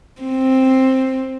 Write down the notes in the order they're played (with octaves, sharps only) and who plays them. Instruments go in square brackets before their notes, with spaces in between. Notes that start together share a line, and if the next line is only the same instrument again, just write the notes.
[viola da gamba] C4